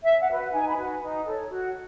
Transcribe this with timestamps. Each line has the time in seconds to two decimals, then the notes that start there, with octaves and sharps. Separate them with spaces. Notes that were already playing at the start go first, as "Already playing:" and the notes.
0.02 C#4 E5
0.19 F#5
0.28 F#4 B4
0.52 D#4 G#5
0.68 B5
0.76 F#4 B4
1.01 D#4
1.26 A4 C#5
1.50 F#4